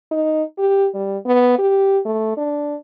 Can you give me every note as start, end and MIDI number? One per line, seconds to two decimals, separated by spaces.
0.11 0.43 63
0.58 0.87 67
0.94 1.17 55
1.26 1.54 59
1.58 1.98 67
2.05 2.37 57
2.37 2.75 62